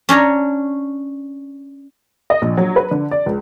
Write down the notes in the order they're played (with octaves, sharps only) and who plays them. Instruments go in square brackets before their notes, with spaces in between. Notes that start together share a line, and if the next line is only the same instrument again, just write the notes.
[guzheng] C#4 D4 C#5 A#5
[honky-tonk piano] D#5
A#1
F#3
B4
D3
D5
C#2